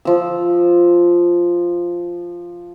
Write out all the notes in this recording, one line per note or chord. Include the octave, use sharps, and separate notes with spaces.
F3 E6